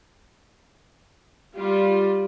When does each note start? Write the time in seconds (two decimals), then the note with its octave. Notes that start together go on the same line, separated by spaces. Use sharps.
1.55 G3 F4